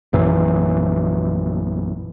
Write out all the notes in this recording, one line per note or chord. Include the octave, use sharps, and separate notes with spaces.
A#1 F#2 E3